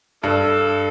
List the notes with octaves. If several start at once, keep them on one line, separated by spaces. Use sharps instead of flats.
G2 A4